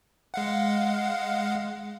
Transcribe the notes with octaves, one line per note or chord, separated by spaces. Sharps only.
G#3 F5 F#5